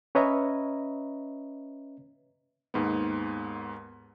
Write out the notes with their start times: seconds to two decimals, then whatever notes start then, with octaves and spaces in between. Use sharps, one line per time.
0.15 C#4 B4 C#5 D#5 E5 A#5
2.74 D#2 G#2 B3